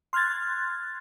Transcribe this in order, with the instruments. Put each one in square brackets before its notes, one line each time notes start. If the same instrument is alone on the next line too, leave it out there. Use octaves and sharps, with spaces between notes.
[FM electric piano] C6 F6 F#6 G#6 A6